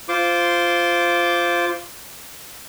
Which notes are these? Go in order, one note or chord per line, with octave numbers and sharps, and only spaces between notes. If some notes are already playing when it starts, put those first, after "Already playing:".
F4 C5 C6 D6